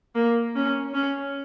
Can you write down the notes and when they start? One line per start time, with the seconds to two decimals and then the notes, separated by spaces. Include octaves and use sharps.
0.15 A#3
0.55 C#4
0.94 C#4